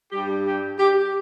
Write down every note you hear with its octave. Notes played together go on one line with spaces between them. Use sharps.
G2 G3 G4
G4
G4